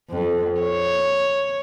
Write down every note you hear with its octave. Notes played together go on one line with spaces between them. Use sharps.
F2
C#5